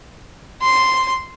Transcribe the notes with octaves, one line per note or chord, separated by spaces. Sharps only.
C6